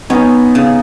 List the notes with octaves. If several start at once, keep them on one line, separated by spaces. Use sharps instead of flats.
B3 C#4 D#4
C#3